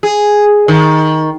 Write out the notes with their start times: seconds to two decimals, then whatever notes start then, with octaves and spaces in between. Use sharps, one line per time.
0.03 G#4
0.68 D#3